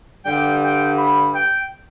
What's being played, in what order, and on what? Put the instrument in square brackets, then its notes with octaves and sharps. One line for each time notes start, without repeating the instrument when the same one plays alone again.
[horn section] G2 D3 G3 G5
G5
B5
G5